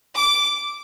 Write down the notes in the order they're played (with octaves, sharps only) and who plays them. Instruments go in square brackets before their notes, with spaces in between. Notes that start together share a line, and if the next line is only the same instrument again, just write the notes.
[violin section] D6